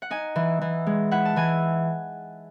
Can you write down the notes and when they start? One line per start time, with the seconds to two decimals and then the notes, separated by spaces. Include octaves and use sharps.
0.02 F#5
0.11 D#4 G#5
0.36 E3
0.61 E3
0.86 G#3
1.11 E4 F#5
1.25 A5
1.36 E3 G#5